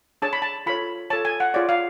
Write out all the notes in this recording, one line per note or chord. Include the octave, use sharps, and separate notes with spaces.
D4 G#4 C#5 A5
B5
A5
F4 A4 C#5 B5
F4 A4 C#5 A5
G#5
F#5
F4 G#4 C#5 D5
F5